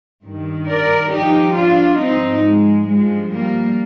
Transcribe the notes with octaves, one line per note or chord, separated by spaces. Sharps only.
G2 D#3
A#4 D5
G2 F3 D#4 G4
D4 F4
G#2 F3 C4 D#4
G#3
G2 F3 G#3
G3 A#3